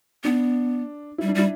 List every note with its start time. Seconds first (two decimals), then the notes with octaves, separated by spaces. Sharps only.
0.24 B3 D4
1.18 E4
1.22 G3
1.28 D4
1.35 G3 E4